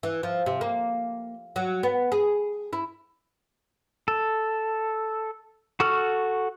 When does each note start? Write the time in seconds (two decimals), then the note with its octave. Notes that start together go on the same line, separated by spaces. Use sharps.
0.03 E3
0.23 F3
0.46 C3
0.61 A#3
1.56 F#3
1.83 B3
2.12 G#4
2.73 E4
4.08 A4
5.80 F#4 A4 C#6 F6